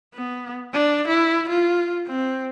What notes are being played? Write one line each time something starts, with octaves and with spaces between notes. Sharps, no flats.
B3
D4
E4
F4
C4